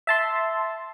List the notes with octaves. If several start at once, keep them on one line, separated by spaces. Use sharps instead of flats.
E5 A5 C6